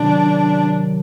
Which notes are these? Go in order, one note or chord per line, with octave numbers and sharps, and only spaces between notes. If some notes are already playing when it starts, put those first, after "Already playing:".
Already playing: C3 D#3 F#3 D4